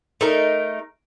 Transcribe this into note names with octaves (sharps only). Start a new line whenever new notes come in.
A3 D#4 A#4